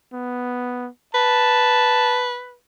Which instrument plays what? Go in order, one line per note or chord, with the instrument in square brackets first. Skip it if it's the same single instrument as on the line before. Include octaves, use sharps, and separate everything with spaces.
[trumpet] B3
[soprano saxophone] B4 [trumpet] A5